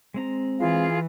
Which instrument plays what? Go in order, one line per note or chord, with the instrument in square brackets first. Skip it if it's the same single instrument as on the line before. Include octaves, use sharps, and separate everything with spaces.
[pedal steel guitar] G#3 C4 A#5
[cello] E3 [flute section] F4 G#4 F5